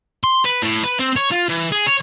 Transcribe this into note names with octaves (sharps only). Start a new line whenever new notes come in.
C6
B4
A2
B4
C4
C#5
F4
E3
G#4
C#5